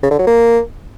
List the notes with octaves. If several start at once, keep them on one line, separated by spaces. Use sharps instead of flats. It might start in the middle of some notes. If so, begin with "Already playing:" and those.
C#3
D3
F#3
A#3